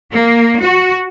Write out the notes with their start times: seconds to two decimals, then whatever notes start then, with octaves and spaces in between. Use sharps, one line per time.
0.12 A#3
0.61 F#4